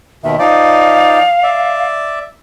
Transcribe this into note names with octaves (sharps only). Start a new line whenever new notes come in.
D#2 B2 D#3 E5
F3 D#4 D5 F5
D5 E5